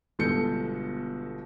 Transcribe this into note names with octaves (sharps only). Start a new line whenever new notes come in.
G1 B2 G#3 A4 G6 C#7